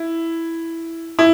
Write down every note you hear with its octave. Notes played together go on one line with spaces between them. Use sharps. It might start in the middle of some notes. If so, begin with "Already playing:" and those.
Already playing: E4
E4